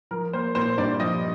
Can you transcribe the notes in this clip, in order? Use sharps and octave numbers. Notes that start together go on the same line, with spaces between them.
F3 A#4
A#3 C5
A#2 C5
G2 D5
F3 D#5